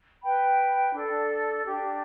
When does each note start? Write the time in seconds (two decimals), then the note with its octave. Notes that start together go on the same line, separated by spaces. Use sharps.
0.22 B4 G5 B5
0.93 D4 A4 D5
1.65 D4 G4 D5